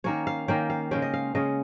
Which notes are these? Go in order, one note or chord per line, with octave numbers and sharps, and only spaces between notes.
D#3 A#3 C#4 C#5
F5
D#3 A#3 C#4 G5
F5
C#3 G#3 C#4 G5
D#5
F5
C#3 G#3 C#4 D#5